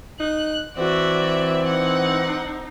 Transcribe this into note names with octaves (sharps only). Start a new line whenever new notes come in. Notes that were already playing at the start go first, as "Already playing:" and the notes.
D#4 F#6
E3 C4 F#4 D5 E5
D#4 F#5